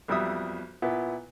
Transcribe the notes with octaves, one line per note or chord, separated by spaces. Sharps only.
B1 F2 G3 E5 D#6
A#2 B3 E4